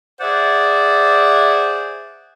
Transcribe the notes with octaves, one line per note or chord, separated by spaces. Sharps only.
G#4 C5 D5 E5 F#5